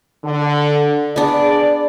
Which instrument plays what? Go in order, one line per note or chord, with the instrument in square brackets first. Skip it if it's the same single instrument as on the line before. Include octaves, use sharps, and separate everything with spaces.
[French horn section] D3
[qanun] B3 D4 [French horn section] G#4 D5